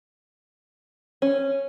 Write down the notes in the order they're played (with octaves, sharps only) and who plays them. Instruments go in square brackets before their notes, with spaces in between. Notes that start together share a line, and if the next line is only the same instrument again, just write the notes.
[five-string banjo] C#4